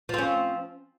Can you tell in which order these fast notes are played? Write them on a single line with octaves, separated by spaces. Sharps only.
F3 C4 C#4